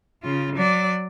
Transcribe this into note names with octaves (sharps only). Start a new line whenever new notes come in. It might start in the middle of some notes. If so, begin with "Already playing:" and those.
C#3 F4
F#3 D5